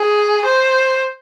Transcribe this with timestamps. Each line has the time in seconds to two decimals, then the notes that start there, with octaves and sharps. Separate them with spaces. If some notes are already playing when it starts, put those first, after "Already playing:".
Already playing: G#4
0.45 C5